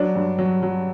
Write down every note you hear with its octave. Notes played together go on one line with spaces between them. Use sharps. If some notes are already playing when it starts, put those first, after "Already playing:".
Already playing: F#3 D4
G2
F#3
F#3